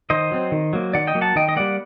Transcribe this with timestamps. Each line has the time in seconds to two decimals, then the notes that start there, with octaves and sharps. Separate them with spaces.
0.10 D#3 C5 D#5
0.31 F#3 C4
0.52 D#3
0.73 F#3 A#3
0.93 D#3 D5 F#5
1.07 D#5 G5
1.15 F#3 A#3
1.21 F#5 A5
1.35 D#3 D#5 G5
1.49 D#5
1.56 G3 A#3 D5 F#5